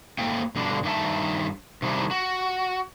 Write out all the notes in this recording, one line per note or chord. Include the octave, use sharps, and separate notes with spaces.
G#2 A3 A#3 G5
G2 B2 D3 D4
G2 D#3 G4 E5 A5
C3 D#3 G3 D4 E4
F#4